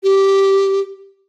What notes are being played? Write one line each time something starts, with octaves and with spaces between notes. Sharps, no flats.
G4